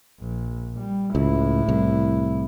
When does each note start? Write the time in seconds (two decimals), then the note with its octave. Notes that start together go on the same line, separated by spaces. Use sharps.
0.20 A#1
0.78 G3
1.15 C#2 A2 E4
1.69 C2